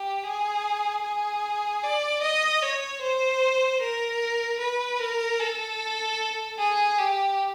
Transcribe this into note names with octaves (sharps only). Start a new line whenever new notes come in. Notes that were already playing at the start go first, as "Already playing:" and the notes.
Already playing: G4
G#4
G#4
D5
D#5
C#5
C5
A#4
B4
A#4
A4
G#4
G4